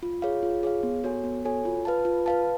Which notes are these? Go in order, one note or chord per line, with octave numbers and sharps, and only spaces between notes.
F4
G#4 C#5 F5
F4
G#4 C#5 F5
B3
F#4 A4 C#5 G#5
B3
F#4 A4 C#5 G#5
F4
B4 F5 A5
F4
B4 F5 A5